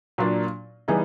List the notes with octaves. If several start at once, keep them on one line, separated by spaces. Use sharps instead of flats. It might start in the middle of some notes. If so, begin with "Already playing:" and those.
A#2 F#3 A#3 D4
E3 G3 B3 D#4 G#4